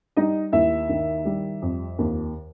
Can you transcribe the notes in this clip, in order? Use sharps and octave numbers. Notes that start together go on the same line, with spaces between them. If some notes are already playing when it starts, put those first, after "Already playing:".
G3 D#4 D#5
D#2 E4 E5
D#3
G3
F2
D#2